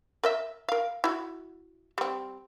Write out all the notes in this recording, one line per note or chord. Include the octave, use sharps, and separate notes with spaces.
A#4 D#5 E5
A#4 F5
E4 F#4
G3 C4